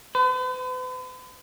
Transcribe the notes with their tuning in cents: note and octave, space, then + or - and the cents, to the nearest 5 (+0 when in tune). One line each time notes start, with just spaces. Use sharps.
B4 +45